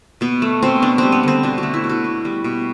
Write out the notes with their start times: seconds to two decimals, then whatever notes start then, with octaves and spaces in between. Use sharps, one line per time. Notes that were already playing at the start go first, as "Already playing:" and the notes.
0.21 B2 B3
0.42 A3
0.62 B2 C4
0.82 B3 D4
0.98 G3 C4
1.12 B3
1.23 D3 C4
1.43 B2 D4
1.58 F#4
1.63 A3
1.74 E4
1.84 B2
1.89 F#4
2.04 B3
2.25 G3
2.44 B2